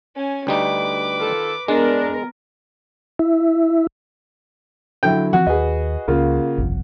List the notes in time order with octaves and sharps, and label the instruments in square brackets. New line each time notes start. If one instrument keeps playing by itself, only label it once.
[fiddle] C#4 G#5
[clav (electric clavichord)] D2 G3 D#4 [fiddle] B4 D6
[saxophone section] D#3 F4 A4
[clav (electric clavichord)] G#3 [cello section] B3 A#4 [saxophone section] D4
[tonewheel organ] E4
[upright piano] D3 F#3 E4 [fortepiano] G5
[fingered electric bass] E3 F3 C4 [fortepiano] F#4
[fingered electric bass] D#2 [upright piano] G#4 B4 D#5
[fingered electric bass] C#2 [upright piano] C#3 A#3 F4
[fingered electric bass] G1 C2 F2